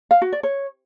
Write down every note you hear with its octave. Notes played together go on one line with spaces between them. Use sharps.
F5
F#4
D5
C#5